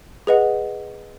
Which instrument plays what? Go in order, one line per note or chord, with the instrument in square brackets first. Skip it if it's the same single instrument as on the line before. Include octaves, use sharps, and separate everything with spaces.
[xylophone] G#4 B4 D#5 F#5